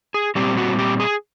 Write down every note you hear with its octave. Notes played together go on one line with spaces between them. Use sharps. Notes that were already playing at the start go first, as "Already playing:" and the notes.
G#4
A#2 G3 C4 G4
F#4
G4
G#4